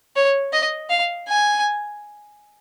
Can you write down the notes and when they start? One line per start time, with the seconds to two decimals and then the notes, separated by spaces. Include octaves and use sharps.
0.16 C#5
0.53 D#5
0.90 F5
1.28 G#5